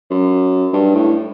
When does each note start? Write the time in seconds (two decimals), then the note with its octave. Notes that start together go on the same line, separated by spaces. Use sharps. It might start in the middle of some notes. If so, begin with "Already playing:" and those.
0.10 F#2
0.73 G2
0.95 A2